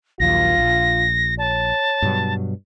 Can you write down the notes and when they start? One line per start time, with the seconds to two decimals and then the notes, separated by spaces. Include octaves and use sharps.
0.20 A#1 D#2 F#3 F4 A#6
0.57 A#1
1.39 C#5 A5
2.02 G2 B2 F#3